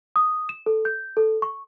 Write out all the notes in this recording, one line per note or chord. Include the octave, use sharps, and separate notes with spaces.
D#6
E7
A4
G6
A4
C#6